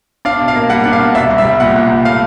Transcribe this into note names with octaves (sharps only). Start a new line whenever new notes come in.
D4 F5
B2
F5
A#3
G3 F#5
D4 F#5
F5
B2
C2 E5
C2
E5
G3
A#2 F#5
C2
C2
A3 F5